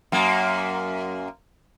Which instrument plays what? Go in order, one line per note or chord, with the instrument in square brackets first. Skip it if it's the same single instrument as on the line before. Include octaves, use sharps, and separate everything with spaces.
[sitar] F#2 A#3